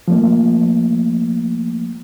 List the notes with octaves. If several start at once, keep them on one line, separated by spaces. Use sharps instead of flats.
F3 A3 A#3